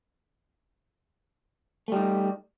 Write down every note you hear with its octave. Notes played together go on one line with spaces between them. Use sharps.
G3 A3 D#4